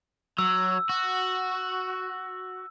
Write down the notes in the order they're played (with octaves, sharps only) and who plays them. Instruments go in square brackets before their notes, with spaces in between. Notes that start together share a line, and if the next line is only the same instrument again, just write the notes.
[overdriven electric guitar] F#3 [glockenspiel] E6
[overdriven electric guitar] F#4